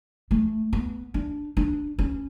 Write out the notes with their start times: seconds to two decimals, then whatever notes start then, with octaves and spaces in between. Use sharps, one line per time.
0.31 A3
0.73 B3
1.14 D4
1.57 D4
1.99 C#4